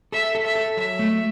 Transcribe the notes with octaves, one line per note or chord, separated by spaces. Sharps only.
A4 E5
A4
E5
A4
F#3 E5
A3